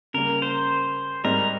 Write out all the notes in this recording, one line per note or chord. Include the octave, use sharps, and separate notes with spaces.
C#3 G3 A#3 A#4
C5
G#2 G3 C4 A#4